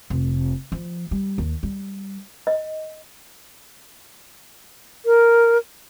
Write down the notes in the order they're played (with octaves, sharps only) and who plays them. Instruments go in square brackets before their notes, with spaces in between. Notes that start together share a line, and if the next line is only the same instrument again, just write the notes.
[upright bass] F1
F3
G3
D#2
G3
[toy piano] D#5
[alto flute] A#4